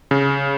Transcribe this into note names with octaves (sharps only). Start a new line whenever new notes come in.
C#3